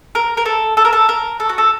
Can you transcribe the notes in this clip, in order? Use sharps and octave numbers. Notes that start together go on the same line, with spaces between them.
A#4
A#4
A4
A4
A#4
A4
A#4
A4
F#4
A4